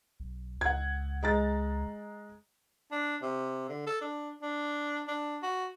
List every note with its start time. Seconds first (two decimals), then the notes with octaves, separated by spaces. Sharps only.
0.20 B1
0.61 C#2 F#5 G#6
1.23 G#3 A#5 A6
2.91 D4
3.22 C3
3.69 D3
3.87 A4
4.01 D4
4.42 D4
5.08 D4
5.43 F#4